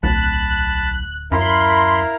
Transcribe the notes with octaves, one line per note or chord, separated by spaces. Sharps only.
D1 B1 A5 B5 F#6
F#2 E4 A#4 F5 B5 C6 C7